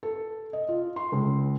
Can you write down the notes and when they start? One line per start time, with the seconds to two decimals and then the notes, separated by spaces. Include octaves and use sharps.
0.03 A4
0.53 D#5
0.69 F4
0.96 C6
1.12 C#2